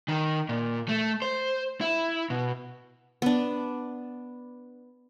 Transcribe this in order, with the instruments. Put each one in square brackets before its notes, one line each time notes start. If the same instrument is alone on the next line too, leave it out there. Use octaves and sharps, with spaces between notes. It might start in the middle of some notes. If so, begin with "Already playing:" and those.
[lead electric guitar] D#3
A#2
A3
C5
E4
B2
[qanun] B3 D4